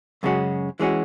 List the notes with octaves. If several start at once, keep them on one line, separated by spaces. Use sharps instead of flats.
F#2 C#3 G#3 C#4 F#4
E3 G#3 C#4 F#4